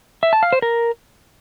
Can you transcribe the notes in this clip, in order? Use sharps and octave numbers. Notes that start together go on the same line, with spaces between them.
E5
A5
F5
C5
A#4